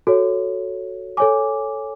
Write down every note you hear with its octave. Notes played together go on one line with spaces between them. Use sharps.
F#4 A4 C#5
A4 C#5 G#5 D6